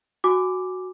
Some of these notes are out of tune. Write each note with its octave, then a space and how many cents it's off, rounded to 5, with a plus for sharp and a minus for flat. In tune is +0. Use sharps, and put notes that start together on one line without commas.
F#4 +0 G#5 +0 D6 +0